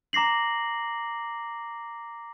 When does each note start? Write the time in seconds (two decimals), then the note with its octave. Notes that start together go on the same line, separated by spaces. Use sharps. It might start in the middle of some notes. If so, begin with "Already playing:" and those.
0.13 A#5 D6 A#6 C7 F#7